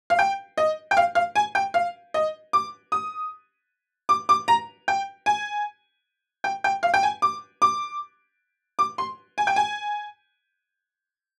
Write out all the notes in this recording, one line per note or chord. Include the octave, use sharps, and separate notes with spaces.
F5
G5
D#5
G5
F5
F5
G#5
G5
F5
D#5
D6
D#6
D6
D6
A#5
G5
G#5
G5
G5
F5
G5
G#5
D6
D6
D6
C6
G#5
G5
G#5